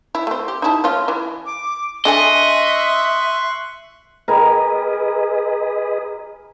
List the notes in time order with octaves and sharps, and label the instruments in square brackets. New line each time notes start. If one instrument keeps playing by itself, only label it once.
[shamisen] E4
A3 C4
G4
D#4 E4 A5
A3 C#4 F4
E3
[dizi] D6
[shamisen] D4 A4 G#5 [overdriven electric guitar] D#5 [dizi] E5 [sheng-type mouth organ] C6 C#6 F#6
[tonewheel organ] G#4 B4 D#5 [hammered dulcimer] A#4 G#5 B5